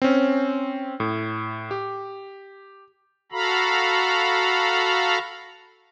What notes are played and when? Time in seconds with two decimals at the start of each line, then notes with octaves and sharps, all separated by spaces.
0.02 C4 C#4
1.00 A2
1.71 G4
3.32 F#4 A4 F5 A#5 B5